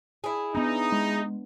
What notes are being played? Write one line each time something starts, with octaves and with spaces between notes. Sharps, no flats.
E4 G#4
B3 D4 D#4
G#3